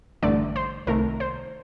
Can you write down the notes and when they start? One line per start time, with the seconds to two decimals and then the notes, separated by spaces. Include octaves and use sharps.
0.22 A1 G2 D3 A3 D5
0.56 C5
0.87 C2 C3 D#3 A3 A#4
1.20 C5